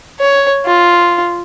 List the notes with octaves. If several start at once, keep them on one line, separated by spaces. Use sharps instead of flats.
C#5
F4